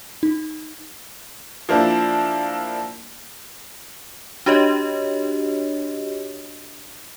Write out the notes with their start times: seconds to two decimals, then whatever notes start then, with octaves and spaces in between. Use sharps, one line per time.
0.23 D#4
1.69 F3 A#3 D4 E4
4.46 D4 F#4 G4 C#5 D#5